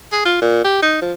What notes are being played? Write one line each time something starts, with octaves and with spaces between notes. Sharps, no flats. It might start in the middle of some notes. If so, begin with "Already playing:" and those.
G#4
F4
A#2
G4
D#4
F3